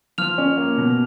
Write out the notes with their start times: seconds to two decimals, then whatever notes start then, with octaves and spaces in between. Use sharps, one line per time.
0.18 F3 F6 F7
0.38 C#4
0.57 A#3
0.78 B2